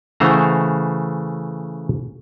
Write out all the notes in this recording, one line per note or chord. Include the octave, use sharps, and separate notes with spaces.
C#3 E3 A3 C5 F#5 A#5